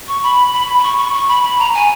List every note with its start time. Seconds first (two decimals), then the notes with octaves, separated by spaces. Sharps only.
0.08 C#6
0.23 B5
0.53 B5
0.79 B5
0.84 C#6
0.98 C#6
1.14 C#6
1.28 B5
1.44 B5
1.59 A#5
1.75 G#5